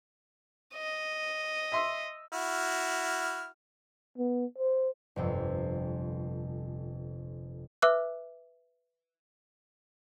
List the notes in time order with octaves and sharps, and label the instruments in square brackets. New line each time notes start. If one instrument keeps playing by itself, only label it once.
[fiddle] D#5
[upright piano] E5 C6 E6
[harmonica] E4 F#4 F6
[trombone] B3
C5
[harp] G1 F2 C3
[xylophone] B4 E5 D6 E6 F#6